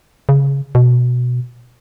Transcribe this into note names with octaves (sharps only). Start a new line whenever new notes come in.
C#3
B2